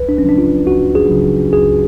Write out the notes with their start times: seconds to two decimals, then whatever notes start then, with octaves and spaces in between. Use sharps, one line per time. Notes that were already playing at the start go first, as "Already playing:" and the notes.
Already playing: C#2 B4
0.09 D4
0.18 C#4
0.24 C#3 F#3 D4
0.38 F4
0.66 C#2 F#4
0.95 G#4
1.09 C#3 F#3
1.53 C#2 G#4